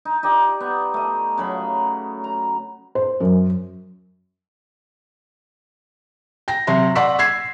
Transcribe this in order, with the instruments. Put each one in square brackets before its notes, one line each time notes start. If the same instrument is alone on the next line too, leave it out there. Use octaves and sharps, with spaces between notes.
[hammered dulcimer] D#4
D#4 G4 D5
B3
A3 D#5
C#3 F#3 B5
A#5
[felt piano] C5
F#2
G5 A#6
C3 F#3 F#4 E5 C6
D5 F#5 C6 C#6 E6 B6
E6 G#6 C7